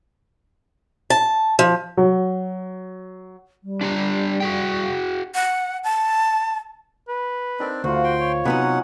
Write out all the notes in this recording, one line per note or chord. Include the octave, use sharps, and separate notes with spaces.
A5
F3
F#3
G3
D4 G4 A#5
F#4 G#4 G5
F#5
A5
B4
C4 D4 D#4 A#4
D2 A3 F4 F#4 C5
G5 C6
C#5
C3 F#3 B3 C#4 D#4 D#5 F#5 B5